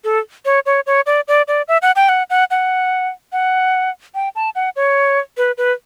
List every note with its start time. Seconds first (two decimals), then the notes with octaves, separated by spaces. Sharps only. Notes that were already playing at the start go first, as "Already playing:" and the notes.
0.04 A4
0.45 C#5
0.66 C#5
0.87 C#5
1.06 D5
1.28 D5
1.48 D5
1.68 E5
1.82 F#5
1.96 G5
2.09 F#5
2.30 F#5
2.51 F#5
3.33 F#5
4.15 G5
4.35 A5
4.55 F#5
4.76 C#5
5.37 B4
5.58 B4